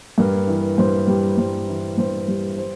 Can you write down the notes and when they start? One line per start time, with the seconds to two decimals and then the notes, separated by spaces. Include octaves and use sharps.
0.18 G2 A#4
0.47 E3
0.78 G2 C5
1.07 G3
1.38 G2 C5
1.68 E3
1.98 G2 C5
2.28 G3
2.57 C5